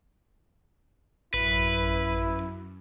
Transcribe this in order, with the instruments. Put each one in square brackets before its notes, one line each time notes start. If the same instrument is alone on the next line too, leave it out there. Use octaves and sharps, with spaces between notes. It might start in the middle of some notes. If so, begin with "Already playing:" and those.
[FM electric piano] A1 [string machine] F#2 [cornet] E4 [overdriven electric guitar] B4